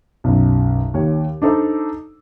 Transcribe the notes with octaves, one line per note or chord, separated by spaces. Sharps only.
B1 F#2
D#2 C#5
D4 D#4 A4 C5